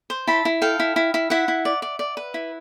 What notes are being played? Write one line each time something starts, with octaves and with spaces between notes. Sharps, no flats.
C5
E4 A5 B5
E4
A4 F5 G5
E4
E4
E4
E4 E5 F#5
E4
D5
D5
D5
B4
E4